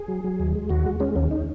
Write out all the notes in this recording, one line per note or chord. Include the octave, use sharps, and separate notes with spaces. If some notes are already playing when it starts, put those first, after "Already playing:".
Already playing: G#4
F#3
F#3
D#2
G#3
D#2 F#4
G#3
G#3 C#4
D#2 C#4
D#4